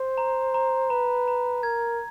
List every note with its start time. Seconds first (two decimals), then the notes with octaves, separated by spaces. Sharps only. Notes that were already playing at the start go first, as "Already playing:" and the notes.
Already playing: C5
0.18 A#5
0.54 A#5
0.90 B4 A#5
1.28 A#5
1.63 A#4 G#6